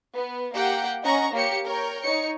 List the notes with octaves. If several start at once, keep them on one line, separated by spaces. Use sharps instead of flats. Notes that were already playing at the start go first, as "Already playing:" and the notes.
B3
A#3 G4 F#5 G5
C#4 D#5 F#5 A#5 C#6
A#3 G4 C#5 C#7
A#4 C#5 G5
D#4 C#5 C#7